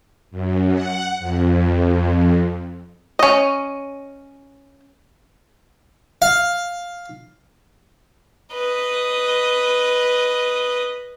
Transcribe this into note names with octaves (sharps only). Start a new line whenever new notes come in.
F#2
F#5
F2
C#4 D#5
F5
B4 D#5